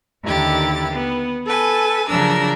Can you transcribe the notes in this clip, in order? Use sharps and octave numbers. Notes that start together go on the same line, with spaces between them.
D#2 D3 D#3 E4 G4 A6
B3
A4 B4 G#5
C#3 F3 F#3 D4 A#4 E6